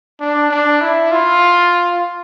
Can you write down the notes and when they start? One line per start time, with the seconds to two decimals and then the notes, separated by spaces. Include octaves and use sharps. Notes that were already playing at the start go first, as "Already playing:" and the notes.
0.20 D4
0.51 D4
0.81 E4
1.11 F4